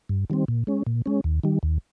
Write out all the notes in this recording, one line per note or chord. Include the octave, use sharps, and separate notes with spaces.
G2
D#3 G3 C4
A#2
G#3 C#4
A#2
G#3 C#4
D#2
D#3 G3
D#2